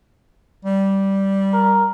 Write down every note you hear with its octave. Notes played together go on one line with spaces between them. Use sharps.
G3
A#4